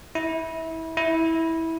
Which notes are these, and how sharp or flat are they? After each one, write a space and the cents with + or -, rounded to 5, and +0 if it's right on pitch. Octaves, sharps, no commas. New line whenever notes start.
E4 -25
E4 -15